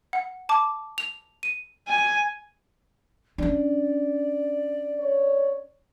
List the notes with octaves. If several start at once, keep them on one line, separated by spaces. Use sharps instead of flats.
F#5
A5 D6
F7
D#7
G#5
C#4 D4 D5
C#5